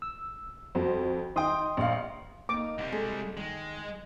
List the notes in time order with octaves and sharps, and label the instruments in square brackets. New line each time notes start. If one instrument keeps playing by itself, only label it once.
[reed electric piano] E6
[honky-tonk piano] F2 [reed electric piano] F#4 C5
[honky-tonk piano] D#3 G5 [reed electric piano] D#5 C6 D#6
[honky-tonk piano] A#1 F5
[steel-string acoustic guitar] A#3 D#4 [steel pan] D6
[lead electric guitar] C2 G3
[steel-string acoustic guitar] G#3 G#4 A4
[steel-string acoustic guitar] D#3 [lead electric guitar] G#3